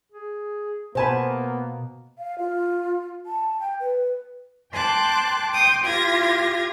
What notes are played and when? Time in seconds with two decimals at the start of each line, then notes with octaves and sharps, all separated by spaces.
0.12 G#4
0.95 B2 A#3 B3 C5 G#5 A5 B5
2.18 F5
2.39 F4
3.26 A5
3.60 G5
3.80 B4
4.73 G5 A5 C6 D6 F#6
5.51 G5 C6 D6 D#6
5.84 F4 G4 G#6 A#6